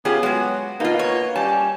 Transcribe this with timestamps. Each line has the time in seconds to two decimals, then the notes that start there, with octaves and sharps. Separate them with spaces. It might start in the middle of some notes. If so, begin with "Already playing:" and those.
0.05 C#3 B3 F4 G4 G#4
0.23 F#3 G#3 F#4
0.80 B2 A#3 D#4 F4
0.99 C#5
1.36 G3 C#4 A5